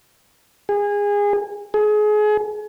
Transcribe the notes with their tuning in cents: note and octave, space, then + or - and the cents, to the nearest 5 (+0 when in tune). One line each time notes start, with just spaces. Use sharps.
G#4 -25
G#4 +30